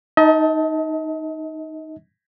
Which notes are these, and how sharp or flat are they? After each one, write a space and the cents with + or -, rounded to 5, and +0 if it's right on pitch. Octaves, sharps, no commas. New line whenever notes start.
D#4 +0 D#5 +35 A5 +0